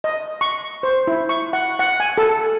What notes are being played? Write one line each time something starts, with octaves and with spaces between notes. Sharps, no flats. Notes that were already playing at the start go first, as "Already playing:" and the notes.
D#5
C#6
C5
E4
C#6
F#5
F#5
G#5
A4